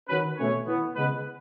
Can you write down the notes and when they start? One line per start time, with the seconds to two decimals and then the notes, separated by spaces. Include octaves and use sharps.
0.09 D#3 F#3 C#4 B4
0.38 B2 A3 C#4 C#5
0.66 E3 B3
0.96 C#3 G#3 B3 B4